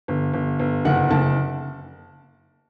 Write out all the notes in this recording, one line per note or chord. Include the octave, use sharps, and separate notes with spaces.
G1
G1
G1
F#1 F#5
F#1 A5